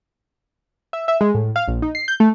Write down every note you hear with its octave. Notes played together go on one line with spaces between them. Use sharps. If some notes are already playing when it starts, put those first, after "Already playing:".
E5
E5
G#3
A2
F5
A#1
D#4
C7
G6
A3